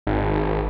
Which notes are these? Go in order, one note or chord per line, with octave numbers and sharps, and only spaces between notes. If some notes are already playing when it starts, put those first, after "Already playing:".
G#1